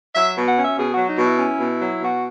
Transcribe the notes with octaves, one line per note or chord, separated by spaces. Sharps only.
F#3 E5
B2
F#5
C#4 E5
B2 G#4
F#4
F#3
D#4
B2
E4
C#4
B2
F#3
B2 F#4